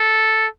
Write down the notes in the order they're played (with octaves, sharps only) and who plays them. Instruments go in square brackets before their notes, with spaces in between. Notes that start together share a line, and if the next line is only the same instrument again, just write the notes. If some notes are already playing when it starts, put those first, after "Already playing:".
Already playing: [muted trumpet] A4